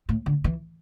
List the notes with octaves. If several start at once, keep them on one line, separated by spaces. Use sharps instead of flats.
A2
D3
E3